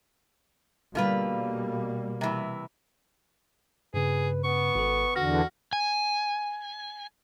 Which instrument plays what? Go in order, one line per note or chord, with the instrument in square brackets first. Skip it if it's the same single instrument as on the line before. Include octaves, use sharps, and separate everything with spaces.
[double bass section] B2 G3 A#3 [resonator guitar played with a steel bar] D3 F4 B4
[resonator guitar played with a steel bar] C3 E3
[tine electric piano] G2 C#3 [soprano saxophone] G#4 [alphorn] B4
[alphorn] B3 [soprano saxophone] C#6
[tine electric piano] G#1 A4
[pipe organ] E2 D3 [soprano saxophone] F#4 [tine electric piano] F6 A#6
[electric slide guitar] G#5